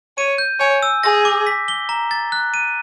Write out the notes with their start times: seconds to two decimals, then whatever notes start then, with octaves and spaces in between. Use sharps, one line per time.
0.17 C#5 D#7
0.38 G6
0.60 C#5 G#5
0.83 E6
1.03 G#4 A#6
1.25 D6
1.47 B6
1.68 G7
1.89 A#5
2.11 A6
2.32 F#6
2.54 D#7